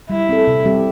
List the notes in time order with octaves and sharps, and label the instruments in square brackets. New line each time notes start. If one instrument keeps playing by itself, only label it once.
[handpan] G3 [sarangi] E4
[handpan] C4 A4
C3
G3 C4 G4